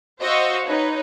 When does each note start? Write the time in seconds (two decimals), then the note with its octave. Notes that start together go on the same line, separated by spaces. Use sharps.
0.22 F#4 C5 D#5 F5 C#6 E6
0.66 D#4 B4 C#5